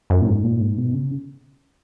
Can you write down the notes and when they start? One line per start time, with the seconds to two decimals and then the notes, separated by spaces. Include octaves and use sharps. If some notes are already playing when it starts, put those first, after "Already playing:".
0.10 F#2
0.21 A#2
0.27 G#2
0.44 A#2
0.61 G#2
0.78 B2
0.94 C#3